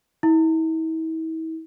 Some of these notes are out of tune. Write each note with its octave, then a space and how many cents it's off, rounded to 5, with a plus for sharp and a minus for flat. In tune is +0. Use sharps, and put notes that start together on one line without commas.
E4 -40